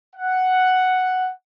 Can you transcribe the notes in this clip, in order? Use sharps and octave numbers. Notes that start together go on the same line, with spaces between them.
F#5